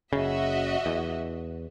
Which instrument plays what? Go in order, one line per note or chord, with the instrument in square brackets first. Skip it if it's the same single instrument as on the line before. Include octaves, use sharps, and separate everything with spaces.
[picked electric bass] F#1 C#3 [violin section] F#4 D#5 E5
[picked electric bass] E2